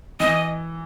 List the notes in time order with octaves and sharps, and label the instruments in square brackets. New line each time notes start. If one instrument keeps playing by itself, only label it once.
[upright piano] E3 [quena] D#5